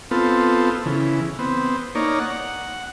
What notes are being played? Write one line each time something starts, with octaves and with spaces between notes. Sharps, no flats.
B3 C4 F4 A4
C#3 E3
B3 C4
A#3 D#4 C#5 D5
F#5